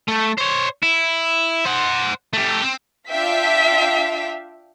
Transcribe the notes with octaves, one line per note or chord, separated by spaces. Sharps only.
A3
C5 C#5
E4
C5 F#5
A3 G4
C4
D4 F4 E5 F5 G5 B6